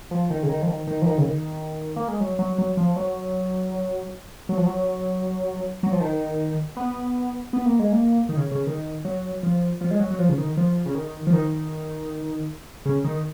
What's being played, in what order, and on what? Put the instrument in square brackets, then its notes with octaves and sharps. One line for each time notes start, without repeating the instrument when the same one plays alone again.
[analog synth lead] F3
D#3
C#3
D#3
F3
D#3
D#3
F3
D#3
C#3
D#3
A#3
G#3
F#3
F#3
F#3
F3
F#3
F#3
F3
F#3
F#3
F3
D#3
B3
B3
A#3
G#3
A#3
D#3
C#3
C#3
D#3
F#3
F3
F3
G#3
F#3
F#3
F3
C#3
D#3
F3
C#3
D#3
F3
D#3
C#3
D#3